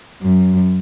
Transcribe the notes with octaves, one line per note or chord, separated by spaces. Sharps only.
F#2